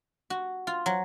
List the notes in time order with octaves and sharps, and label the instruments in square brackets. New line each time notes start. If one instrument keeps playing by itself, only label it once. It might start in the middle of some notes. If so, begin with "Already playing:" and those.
[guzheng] F#4
F4
F#3